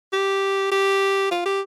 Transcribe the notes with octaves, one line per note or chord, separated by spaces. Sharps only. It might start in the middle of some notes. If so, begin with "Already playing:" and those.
G4
G4
F4
G4